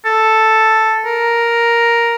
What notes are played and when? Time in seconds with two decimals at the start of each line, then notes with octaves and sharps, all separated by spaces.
0.05 A4
1.06 A#4